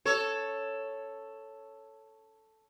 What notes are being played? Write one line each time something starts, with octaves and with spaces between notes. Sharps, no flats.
A4 C#5